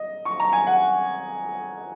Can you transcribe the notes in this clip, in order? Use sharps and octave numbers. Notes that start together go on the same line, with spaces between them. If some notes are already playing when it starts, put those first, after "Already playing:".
Already playing: D#5
C#6
A#5
G#5
F#5